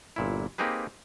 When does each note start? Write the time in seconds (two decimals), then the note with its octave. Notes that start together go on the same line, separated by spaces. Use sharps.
0.16 G1 A#2 E4
0.58 A#3 C4 D#4 G4 G#4 B4